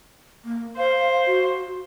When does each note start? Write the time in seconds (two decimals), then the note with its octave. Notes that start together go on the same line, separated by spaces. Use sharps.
0.45 A#3
0.77 C5 F5
1.27 F#4